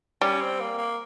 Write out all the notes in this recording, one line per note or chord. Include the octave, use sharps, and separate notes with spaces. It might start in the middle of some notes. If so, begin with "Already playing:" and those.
G3 C#4
C4
A#3
A#3